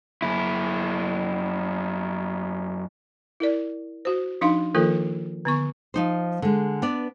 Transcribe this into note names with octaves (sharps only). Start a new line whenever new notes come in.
F#2 E4
E4 A#4 D5
F#4 C5
F3 D4 D#4 F5 C6
D#3 F3 A#3 F4 A4 A#4
D3 B3 C#6
F3 D#4 C5
D3 G#3
B3 D4 D5